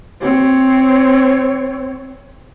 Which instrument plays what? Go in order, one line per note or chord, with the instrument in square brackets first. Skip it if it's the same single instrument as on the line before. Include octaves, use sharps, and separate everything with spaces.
[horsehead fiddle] C4 C#5